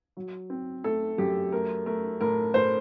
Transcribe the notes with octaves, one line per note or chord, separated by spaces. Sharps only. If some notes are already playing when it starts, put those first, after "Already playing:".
F#3
C4
A3 A4
F#2 G4
A3 A#4
A3 A#4
A2 A#4
A2 C5